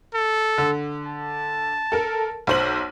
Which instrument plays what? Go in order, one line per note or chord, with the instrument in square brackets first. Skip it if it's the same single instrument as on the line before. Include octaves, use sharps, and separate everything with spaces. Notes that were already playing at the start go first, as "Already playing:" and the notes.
[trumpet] A4
[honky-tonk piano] D3
[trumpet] A5
[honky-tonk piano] A4 A#4
B1 C5 F#7